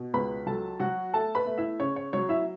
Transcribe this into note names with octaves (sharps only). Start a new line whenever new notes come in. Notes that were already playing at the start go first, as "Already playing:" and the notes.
Already playing: B2
C#2 B4 B5
F#3 A4 A5
F#3 F#4 F#5
A3 A4 A5
B4 B5
A3
E4 E5
C#3 C#5
C#5
F#3 C#5
E4 E5